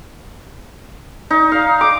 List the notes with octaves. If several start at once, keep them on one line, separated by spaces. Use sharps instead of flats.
D#4
F5
D6